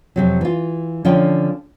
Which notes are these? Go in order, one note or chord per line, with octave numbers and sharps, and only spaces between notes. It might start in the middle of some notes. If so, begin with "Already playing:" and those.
F2 C3 F#3
E3 F4
D3 F3 C#4 F4 G5